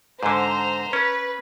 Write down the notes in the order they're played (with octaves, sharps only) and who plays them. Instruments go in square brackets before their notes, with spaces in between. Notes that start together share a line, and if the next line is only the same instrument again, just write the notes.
[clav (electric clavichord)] G#2 D3 [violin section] C5 A#5
[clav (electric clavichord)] C#4 [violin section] B4